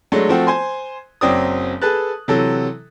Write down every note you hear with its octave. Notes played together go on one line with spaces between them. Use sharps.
F#3 G#3 A3 D4
F3 A3 C4 F#4
C5 G#5 C6
F#1 F#3 C4 D5 D#6
G#4 A4 B4 A5 F#6
C3 E3 F#3 A4